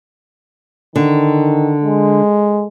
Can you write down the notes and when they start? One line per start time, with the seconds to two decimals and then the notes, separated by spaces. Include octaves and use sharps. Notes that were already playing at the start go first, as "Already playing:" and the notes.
0.96 D3 D#3
1.84 G#3